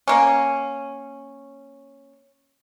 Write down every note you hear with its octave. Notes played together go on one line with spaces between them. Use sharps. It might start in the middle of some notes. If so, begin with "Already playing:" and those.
A#3 C#4